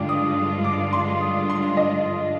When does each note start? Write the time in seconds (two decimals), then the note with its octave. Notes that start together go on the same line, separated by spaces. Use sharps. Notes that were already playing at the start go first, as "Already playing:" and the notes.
Already playing: G2 D3 G#3 D4 F4 G5 D6
0.09 D#6
0.64 D6
0.93 C6
1.21 D#6
1.50 C6
1.77 D#5